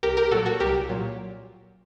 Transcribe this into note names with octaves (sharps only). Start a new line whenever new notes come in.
C2 G4 A#4
G4 A#4
A#2 F#3 F#4 A4
F#4 A4
C2 G4 A#4
A#2 F#3